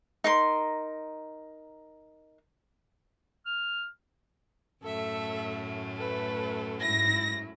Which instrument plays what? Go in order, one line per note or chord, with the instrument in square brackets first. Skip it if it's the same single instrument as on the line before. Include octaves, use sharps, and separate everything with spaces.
[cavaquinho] D#4 A#4 C6
[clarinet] F6
[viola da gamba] F#2 A2 A3 [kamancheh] A4 E5
[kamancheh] A4 B4
[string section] G#2 A#6 [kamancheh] E4